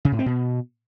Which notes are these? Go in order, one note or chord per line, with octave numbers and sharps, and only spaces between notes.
C#3
A2
C4
B2